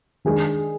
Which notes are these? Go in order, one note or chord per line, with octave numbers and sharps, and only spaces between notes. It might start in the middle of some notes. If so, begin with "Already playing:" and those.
D#3 G#3 D4 G#4